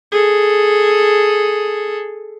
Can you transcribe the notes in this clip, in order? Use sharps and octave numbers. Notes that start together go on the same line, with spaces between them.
G#4 A4